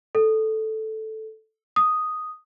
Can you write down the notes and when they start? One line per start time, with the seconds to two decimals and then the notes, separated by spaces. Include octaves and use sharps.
0.15 A4
1.76 D#6